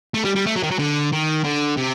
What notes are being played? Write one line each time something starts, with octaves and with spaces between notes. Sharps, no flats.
A3
G3
G3
A3
F#3
D#3
F#3
D3
D#3
D3
C3